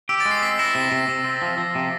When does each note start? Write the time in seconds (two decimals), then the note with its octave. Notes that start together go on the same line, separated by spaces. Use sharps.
0.09 G4 E6
0.20 A6
0.26 G#3
0.31 C7
0.42 C4 B6
0.59 E4 A#6
0.75 C3 A#6
0.92 C3
1.08 C3
1.24 C4
1.42 F3
1.58 F3
1.75 C3